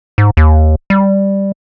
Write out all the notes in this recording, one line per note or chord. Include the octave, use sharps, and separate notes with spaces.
G#2
D#2
G3